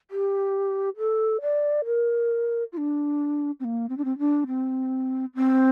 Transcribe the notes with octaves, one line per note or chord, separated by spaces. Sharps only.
G4
A4
D5
A#4
F4
D4
C4
A#3
C4
D4
C4
D4
C4
C4